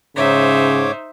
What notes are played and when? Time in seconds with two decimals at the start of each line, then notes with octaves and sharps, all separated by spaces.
0.17 G#2 C#3 D#4 C5 C#5 E5 D6